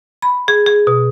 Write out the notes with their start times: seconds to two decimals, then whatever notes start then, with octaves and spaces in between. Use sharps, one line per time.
0.22 B5
0.48 G#4
0.66 G#4
0.87 B2